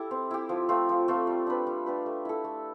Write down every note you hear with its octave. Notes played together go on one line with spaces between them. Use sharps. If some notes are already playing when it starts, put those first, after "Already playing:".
Already playing: E4 G4 A4
C4
E4 G4
F3
A3 C4 F4
F3
A3 C4 F4
G3
D4 G4 B4
G3
D4 G4 B4
A3
E4 A4
A3